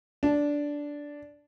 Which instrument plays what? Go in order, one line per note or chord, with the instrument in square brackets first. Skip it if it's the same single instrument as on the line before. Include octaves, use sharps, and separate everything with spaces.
[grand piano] D4